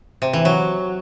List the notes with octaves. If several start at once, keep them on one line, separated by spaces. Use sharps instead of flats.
C3
E3
F#3